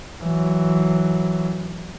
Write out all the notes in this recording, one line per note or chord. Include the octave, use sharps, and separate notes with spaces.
E3 F#3